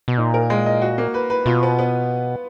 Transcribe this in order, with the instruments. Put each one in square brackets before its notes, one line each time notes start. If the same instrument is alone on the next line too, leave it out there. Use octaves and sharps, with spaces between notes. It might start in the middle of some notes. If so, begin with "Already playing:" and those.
[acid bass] B2
[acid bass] A#2 [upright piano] D#4
[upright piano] A#4
G#3
D#5
F#4
A#3
B4
B4
[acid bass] B2 [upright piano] F4
[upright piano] B3
B3